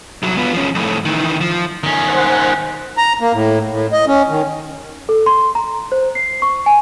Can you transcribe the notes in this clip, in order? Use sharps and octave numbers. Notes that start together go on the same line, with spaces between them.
C2 F#3
B3 F4
F3 C#4
F2 A2
D#3 E3
F3
D#3 C#4
C5 F#5
A#5
A#3
A2
A2
D#5
C#4
D#3
A4
C6
A#5
C5
C7
C#6
G#5